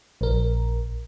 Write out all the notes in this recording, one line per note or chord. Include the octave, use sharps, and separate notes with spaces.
A#1 A#4